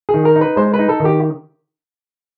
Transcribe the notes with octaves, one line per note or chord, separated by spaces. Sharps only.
G#4
D#3
A#4
D#4
B4
G#3 C5
B4
D#4
A4
D#3
G4